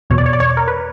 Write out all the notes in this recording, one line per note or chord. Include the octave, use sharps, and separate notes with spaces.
E2 B2 C#5
D5
C#5
D5
C#5
A#4
B4